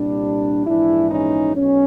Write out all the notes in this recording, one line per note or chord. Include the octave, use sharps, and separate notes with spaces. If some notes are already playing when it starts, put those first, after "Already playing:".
Already playing: C2 A#2 G3 D4
A#1 G#2 E3 D4 E4
C#4 D#4
B1 C#4